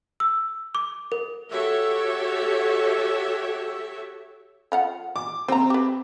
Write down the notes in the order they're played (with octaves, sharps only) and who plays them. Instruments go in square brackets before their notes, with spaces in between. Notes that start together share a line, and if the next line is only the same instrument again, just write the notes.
[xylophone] E6
D6
A#4
[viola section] F#4 G4 A4 C#5 E5
[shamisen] F3 F5 F#5
[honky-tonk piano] D6
[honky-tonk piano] C4 [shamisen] C5 A#5
[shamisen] G4 B4